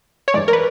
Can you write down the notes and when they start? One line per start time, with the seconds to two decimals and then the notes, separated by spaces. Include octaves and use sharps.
0.28 C#5
0.34 G2 E3 G#3 D5
0.48 A#4
0.53 B4